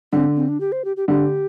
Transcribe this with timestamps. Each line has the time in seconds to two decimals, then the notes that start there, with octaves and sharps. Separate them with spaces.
0.12 D3 C4
0.36 C4
0.48 D4
0.60 G4
0.72 C5
0.85 G4
0.97 G4
1.08 D3 G4